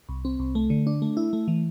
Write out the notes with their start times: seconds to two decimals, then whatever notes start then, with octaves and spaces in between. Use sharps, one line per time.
0.09 C2
0.25 C4
0.40 C2
0.55 A3
0.70 D3
0.87 D4
1.02 A3
1.17 E4
1.33 A3
1.48 E3